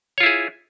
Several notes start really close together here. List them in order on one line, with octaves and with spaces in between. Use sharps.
C#5 F4 E4 G#4